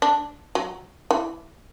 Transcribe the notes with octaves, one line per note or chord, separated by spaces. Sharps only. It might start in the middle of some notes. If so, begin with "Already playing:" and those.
D4
F#3
E3